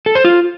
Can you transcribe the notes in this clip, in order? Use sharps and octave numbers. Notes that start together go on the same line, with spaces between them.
A4
C5
F4